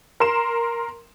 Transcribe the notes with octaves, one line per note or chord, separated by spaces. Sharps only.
A#4 C6 E7